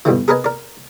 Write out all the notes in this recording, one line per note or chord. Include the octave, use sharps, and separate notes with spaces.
G2 B2 D3 E3
G#4 A#4 B4 D#5 G#5
A#4 D5